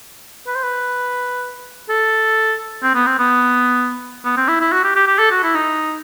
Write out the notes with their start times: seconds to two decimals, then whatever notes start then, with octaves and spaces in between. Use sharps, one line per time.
0.47 B4
0.55 C5
0.63 B4
1.89 A4
2.83 C4
2.95 B3
3.06 C4
3.19 B3
4.25 B3
4.37 C4
4.48 E4
4.60 E4
4.72 F#4
4.84 G4
4.96 G4
5.07 G4
5.19 A4
5.31 F#4
5.43 E4
5.55 D#4